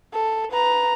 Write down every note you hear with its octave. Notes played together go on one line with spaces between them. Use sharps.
A4
B4 A#5